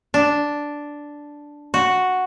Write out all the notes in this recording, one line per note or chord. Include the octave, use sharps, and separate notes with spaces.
D4
F#4